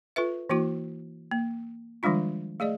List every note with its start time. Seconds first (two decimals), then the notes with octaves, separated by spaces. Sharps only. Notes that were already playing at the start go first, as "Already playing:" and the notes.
0.16 F4 A4 B4 E5
0.50 E3 A#3 E4 F#4
1.31 A#3
2.03 D#3 F3 G3 G#3 D4 F4
2.60 A3 G#4 D5 D#5